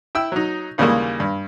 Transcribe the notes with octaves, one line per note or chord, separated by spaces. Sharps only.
E4 G5 E6
F#3 D#4
D#2 C#3 E3 G3 G#3 A#3
G2